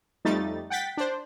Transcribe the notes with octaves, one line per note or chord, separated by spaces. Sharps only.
F2 G3 A3 D#4 A6
F#5 G5 A6 B6
D4 C5